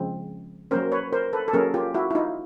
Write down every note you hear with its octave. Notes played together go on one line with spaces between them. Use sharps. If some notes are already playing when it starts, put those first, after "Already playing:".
Already playing: C#3 F3 G#3 C4
F#3 A#3 C#4 A#4 C5
B4 C#5
A#4 C5
A4 B4
A4
F#3 A#3 C#4 G#4 A#4
F4 G4
E4 F#4
E4
D#4 F4